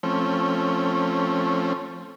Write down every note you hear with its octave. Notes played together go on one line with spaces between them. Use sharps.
F3 A3 C4 C#4